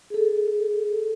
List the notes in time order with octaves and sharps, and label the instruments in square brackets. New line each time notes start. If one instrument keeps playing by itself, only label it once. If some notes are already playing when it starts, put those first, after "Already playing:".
[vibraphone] G#4 A4